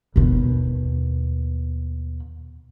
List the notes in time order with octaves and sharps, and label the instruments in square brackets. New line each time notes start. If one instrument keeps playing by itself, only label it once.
[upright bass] D#2 B2